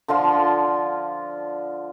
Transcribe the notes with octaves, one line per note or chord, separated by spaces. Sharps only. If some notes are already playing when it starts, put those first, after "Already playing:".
D3 F3 F4 C6